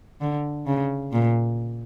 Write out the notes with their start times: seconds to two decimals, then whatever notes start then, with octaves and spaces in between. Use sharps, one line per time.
0.21 D3
0.67 C#3
1.12 A#2